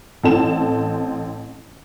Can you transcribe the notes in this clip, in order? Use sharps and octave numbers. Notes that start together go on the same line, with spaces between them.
A1 C4 A4 A5 E7